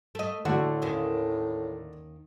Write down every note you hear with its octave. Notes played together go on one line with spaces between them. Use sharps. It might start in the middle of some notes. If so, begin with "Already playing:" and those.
A3 D#5
A2 D3 A3 F#4
D#2 D#3 C#4